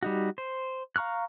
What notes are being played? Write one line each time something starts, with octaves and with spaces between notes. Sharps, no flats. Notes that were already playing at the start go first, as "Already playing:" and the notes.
G3 D#4 F#4
C5
F5 A#5 C#6 F6 F#6